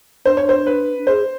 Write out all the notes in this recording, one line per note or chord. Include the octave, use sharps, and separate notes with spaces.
D4 C5
C#5
C5
B4
G#4 C5